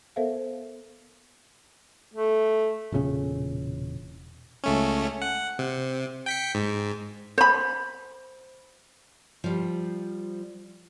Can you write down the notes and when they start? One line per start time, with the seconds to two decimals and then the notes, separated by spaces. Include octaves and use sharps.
0.16 B3 A4 A#4 C5 E5 F5
2.14 A3
2.92 E1 A#2 C#3 C#4
4.64 C#2 A3 C#4
5.22 F#5
5.59 C3
6.26 G5 B6 C#7
6.55 G#2
7.38 C5 B5
9.44 F3 G3